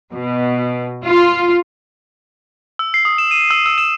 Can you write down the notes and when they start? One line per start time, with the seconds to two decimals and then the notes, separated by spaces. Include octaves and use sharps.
0.13 B2
1.05 F4
2.79 E6
2.94 C7
3.05 D#6
3.18 E7
3.31 D#7
3.51 E6
3.66 E6
3.78 E7